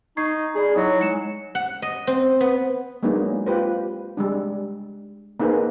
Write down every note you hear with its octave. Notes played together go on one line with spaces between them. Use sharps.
D#4 C#6 G#6 C7
D#4 G#4 D5 B5
F#3 D#4 E4 D#5
G#3 C#7 E7
F#5
D#5
C4
B3
F#3 G#3 A#3 B3 D4 D#4
F4 G4 B4 C5
G3 G#3 D4
A#3 B3 D#4 G#4 B4 C5